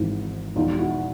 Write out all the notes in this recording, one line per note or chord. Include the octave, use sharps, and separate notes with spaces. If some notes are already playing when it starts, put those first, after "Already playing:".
Already playing: G#1 G#2 E3
E1 E2 B2 D#4 F4
E4 F#4